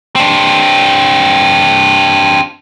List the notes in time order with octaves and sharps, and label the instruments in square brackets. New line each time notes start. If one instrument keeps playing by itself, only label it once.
[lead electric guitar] C4 D4